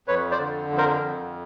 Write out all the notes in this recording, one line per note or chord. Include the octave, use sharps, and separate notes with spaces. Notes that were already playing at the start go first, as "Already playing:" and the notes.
F2 B4 C#5
C5 D5
D3
F2
A#4 C5
F2